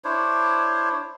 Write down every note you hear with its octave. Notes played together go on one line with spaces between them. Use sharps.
D4 E4 C5 C#5